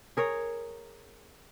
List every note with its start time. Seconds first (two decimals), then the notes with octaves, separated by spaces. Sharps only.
0.17 G#4 A#4 C#5